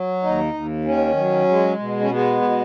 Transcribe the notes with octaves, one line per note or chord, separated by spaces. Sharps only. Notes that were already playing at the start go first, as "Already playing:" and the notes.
Already playing: F#3
D#2 D#4
D#2
D#3 C#4
F#3
G#3
B2
C#4
G#3 B3
B2